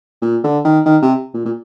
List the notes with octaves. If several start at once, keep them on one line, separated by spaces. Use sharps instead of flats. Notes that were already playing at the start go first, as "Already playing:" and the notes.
A#2
D3
D#3
D#3
C3
A#2
A#2